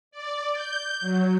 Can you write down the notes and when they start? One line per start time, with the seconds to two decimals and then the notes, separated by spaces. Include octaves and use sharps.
0.11 D5
0.53 G6
1.00 F#3